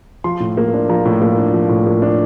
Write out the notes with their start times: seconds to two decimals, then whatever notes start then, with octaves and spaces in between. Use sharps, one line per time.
0.24 F3 C6
0.40 A2
0.57 A#3
0.74 D4
0.89 F3 A#5
1.05 A2
1.22 A#3
1.38 D4
1.53 F3
1.69 A2
1.86 A#3
2.02 D4